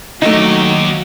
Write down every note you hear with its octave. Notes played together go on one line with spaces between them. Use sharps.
D#2 F#3 A3 D#4 G4 D#5